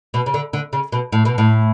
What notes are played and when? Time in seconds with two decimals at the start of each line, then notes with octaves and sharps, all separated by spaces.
0.14 B2
0.26 C#3
0.34 D3
0.53 D3
0.73 C#3
0.92 B2
1.12 A2
1.25 B2
1.38 A2